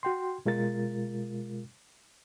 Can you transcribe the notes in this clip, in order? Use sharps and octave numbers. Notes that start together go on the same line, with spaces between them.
F#4 G5 C6
B2 G#3 F4 A#4 A6